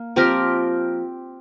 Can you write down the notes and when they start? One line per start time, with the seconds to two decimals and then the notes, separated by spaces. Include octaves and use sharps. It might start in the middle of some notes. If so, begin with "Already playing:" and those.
Already playing: A#3
0.16 F3 C4 G4 A#4